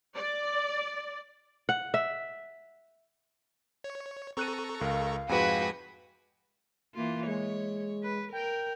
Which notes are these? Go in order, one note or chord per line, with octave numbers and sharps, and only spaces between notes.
D5
F#5
E5
C#5
C4 A4 A#5 C#6 F#6 D#7
C#2 A#4 F5
F2 G#2 G#3 F#4 B4 G5 G#5
E3 A#3 F4
G#3 C#5
B4
A#4 G5